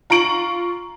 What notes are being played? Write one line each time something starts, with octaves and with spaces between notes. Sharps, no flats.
F4 A#5 C#6 D7 F#7